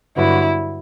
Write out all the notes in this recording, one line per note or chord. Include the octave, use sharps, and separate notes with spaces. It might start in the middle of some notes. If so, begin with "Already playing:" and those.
G2 D3 F#3 B3 E4